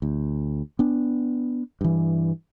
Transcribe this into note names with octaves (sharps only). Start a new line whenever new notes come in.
D2
B3 D4
G2 E3